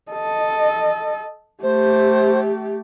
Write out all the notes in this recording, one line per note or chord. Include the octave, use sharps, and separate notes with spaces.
A4 D#5
A3 G4 C5